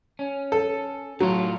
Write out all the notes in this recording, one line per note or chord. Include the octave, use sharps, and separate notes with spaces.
C#4
A4
A2 F#3 F4